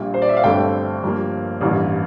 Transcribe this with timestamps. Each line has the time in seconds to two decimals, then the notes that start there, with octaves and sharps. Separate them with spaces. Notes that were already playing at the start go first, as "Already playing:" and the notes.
Already playing: A#1 A#2 G3
0.14 C5
0.22 D5
0.29 E5
0.37 F5
0.43 G1 G2 D3 A3 C4 G5
1.03 G2 F3 A#3
1.61 A1 G2 E3 A#3